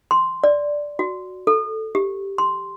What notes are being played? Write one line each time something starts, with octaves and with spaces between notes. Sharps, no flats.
C6
D5
F#4
A4
G4
C6